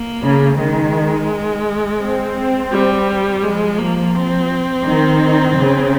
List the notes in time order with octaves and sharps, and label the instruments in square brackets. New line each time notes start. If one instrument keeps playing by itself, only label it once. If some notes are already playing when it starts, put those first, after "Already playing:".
Already playing: [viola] A#3
[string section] C#3
[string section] D#3 [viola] G#3
[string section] C4
[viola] G3
[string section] F3 [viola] G#3
[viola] A#3
C4
[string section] D#3
C#3